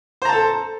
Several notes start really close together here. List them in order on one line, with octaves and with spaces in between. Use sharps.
C5 A#5 A5 A4